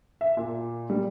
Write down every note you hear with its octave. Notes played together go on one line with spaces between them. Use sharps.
E5
A#2
G3